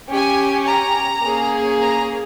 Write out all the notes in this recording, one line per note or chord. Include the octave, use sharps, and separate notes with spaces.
C#4 G4 G#5
A#5
A#3 C#4 G#4
A#5